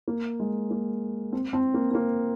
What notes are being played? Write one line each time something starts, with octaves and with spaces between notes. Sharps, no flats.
A#3
G#3
A#3
C4
C4
A#3
C4
A#3